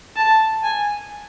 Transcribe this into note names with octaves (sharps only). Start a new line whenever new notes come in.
A5
G#5